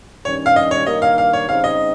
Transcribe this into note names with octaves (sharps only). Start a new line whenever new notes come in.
G2 D#3 G3 C#4 C#5
F5
D#5
C#5
G2 D#3 A#3 D#5
F5
F5
C#5
C#3 G3 C4 D#4 F5
D#5